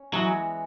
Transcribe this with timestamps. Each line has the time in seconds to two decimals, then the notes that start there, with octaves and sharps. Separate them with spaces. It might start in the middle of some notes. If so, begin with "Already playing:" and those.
Already playing: C#4
0.13 E3 F#3 G#3 B3 F#4